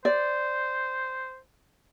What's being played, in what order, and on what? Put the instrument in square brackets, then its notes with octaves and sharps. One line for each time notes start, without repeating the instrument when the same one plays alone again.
[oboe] C5 [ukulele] D5